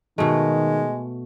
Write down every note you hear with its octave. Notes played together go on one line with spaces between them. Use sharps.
B2 D#3 G#3 A3